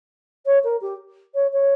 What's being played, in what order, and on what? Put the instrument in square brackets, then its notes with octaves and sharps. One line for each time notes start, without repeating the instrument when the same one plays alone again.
[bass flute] C#5
A#4
G4
C#5
C#5